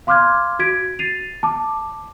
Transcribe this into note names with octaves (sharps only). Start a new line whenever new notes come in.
F5 C6 D6 F6 F#6 G#6
F#4 G#6 B6 D7
A6 C7 D#7 F7
A5 D6